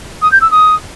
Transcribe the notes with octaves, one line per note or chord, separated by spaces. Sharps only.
D#6
G6
E6
D#6